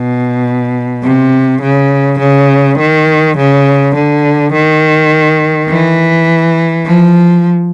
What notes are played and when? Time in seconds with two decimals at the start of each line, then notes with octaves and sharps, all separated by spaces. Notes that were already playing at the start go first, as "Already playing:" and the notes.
Already playing: B2
1.03 C3
1.62 C#3
2.19 C#3
2.78 D#3
3.37 C#3
3.95 D3
4.53 D#3
5.69 E3
6.86 F3